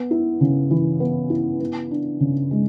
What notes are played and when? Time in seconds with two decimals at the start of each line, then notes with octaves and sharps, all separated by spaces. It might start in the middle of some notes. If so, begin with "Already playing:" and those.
Already playing: B3
0.11 E4
0.41 C#3
0.70 E3
1.00 B3
1.30 E4
1.60 B3
1.91 D4
2.20 C#3
2.51 G#3